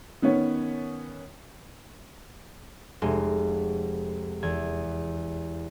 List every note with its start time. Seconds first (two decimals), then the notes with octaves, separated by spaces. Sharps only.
0.22 D#3 B3 C#4 C#5
3.02 F1 G#3
4.43 E2 G#6